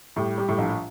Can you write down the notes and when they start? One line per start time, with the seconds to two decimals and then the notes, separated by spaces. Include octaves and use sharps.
0.16 A2 G3
0.38 G3
0.48 A2
0.58 A#1